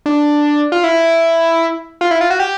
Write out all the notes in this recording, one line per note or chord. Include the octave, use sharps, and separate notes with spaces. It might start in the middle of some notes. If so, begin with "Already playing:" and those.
D4
F4
E4
F4
E4
F4
F#4
G4